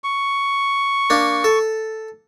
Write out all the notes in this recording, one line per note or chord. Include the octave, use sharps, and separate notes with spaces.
C#6
A#3 D4
A4